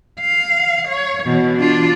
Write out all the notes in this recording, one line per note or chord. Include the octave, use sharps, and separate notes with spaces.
F5
C#5
B2 E3
D4 F4